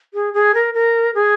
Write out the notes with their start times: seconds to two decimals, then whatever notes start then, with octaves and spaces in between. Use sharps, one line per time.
0.14 G#4
0.34 G#4
0.54 A#4
0.74 A#4
1.15 G#4